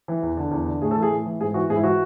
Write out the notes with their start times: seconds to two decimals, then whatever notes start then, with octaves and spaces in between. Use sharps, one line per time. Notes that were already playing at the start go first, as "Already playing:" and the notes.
0.08 E3
0.23 E2
0.37 D3
0.51 E2
0.66 D3
0.81 A2 G#4
0.91 A4
0.96 E3
1.02 G#4
1.11 A2
1.26 E3
1.40 G#2 G#4
1.54 E3 F#4
1.70 G#2 G#4
1.76 E4
1.84 E3 F#4